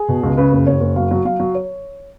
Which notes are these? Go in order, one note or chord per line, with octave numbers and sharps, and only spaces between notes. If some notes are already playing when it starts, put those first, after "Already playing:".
Already playing: G#4
B2
C#2
C#3 B4
F#1
F#1 C#5
F#1
F#3 F5
F#3
F#3 F5
F#3
C#5